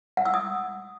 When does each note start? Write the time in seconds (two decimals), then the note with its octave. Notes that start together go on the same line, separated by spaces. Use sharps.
0.17 F#5
0.25 E6
0.34 D#6